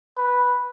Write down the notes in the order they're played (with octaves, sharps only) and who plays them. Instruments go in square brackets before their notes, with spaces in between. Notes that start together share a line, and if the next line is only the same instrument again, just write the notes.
[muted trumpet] B4